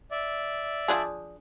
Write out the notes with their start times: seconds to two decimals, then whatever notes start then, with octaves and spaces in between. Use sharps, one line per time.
0.11 D5 E5
0.88 F3 D4 G#4